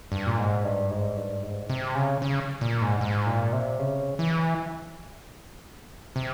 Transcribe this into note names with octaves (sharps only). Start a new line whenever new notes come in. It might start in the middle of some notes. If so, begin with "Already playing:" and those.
G2
A#2
G#2
G2
G#2
G2
G#2
C3
C#3
C#3
A#2
G#2
G#2
A#2
C3
C#3
E3
C3